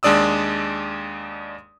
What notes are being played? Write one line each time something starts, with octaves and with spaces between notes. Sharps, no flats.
D#2 G#3 D4 D5 D#6 E6